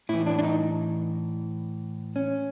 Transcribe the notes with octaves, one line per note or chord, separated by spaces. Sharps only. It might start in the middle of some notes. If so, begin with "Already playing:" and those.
A2 E3 E4
D4
D4
D#4
C#4